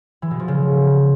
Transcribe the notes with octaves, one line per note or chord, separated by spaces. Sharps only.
E3
B2
F3
C#3